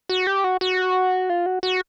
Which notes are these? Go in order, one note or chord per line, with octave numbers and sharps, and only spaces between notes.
F#4
G4
F#4
F#4
F4
F#4
F#4